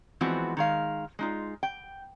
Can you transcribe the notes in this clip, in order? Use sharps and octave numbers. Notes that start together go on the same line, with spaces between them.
E3 F3 G#3 B3 C4 F#4
D#3 G#3 F5
G#3 D#4 F4
G5